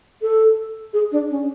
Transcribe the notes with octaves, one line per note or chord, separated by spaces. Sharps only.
A4
G#4
D4
C#4